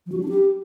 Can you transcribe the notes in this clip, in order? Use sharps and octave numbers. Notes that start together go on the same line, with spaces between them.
F3
F#4
F#3
D4
G4